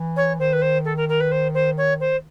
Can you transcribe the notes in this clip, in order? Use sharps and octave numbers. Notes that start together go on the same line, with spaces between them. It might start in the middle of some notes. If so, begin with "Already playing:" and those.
Already playing: E3
C#5
D#3 C5
B4
C5
A4
A#4
A#4
B4
C5
C5
C#5
C5